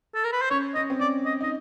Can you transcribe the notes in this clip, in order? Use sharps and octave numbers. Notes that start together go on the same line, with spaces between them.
A4
A#4
B4
C5
C#4 C#5
C#4 D#5
C4
C#4 D5
D#5
D#4 D#5